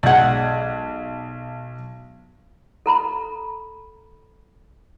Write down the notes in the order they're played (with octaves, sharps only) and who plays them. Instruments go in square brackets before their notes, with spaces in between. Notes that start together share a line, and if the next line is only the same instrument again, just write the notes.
[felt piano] B1 G#3 G#6 [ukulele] D5 F#5
[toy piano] A4 A#5 B5